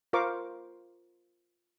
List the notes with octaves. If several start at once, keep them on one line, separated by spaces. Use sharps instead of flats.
F4 A#4 C5 F5 C#6 D6